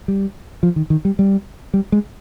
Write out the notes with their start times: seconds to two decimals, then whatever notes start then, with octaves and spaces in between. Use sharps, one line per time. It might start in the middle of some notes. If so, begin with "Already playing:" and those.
0.08 G3
0.63 F3
0.76 D#3
0.90 D#3
1.05 G3
1.19 G3
1.74 G3
1.92 G#3